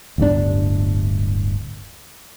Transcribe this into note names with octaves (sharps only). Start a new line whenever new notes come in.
D1 G1 G2 D4